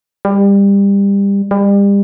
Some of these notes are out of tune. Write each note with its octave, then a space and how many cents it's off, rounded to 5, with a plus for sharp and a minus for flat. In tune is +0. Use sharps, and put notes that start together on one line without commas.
G3 +25
G3 +35